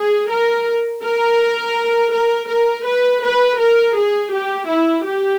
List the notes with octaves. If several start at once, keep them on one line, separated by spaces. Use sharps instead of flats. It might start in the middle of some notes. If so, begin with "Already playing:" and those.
Already playing: G#4
A#4
A#4
A#4
A#4
B4
B4
A#4
G#4
G4
E4
G4